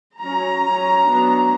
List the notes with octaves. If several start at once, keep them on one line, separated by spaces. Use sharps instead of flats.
F#3 C#4 A#5
F#3 C#4
F#3 B3 D4